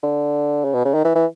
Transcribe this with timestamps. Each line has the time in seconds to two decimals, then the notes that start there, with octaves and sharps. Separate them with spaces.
0.03 D3
0.65 C#3
0.74 B2
0.85 C#3
0.94 D#3
1.05 E3
1.15 E3